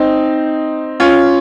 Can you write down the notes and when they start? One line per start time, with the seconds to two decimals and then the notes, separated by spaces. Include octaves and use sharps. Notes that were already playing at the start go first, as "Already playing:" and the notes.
Already playing: C4 D#4
1.00 C#4 F4